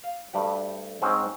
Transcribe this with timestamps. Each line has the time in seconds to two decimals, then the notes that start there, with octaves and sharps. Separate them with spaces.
0.04 F5
0.33 D2 G2 G3 G4 F#5
1.02 G#2 C4 C#4 F#4